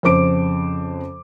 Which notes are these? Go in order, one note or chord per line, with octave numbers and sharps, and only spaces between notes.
F2 C#3 C5 D6 D7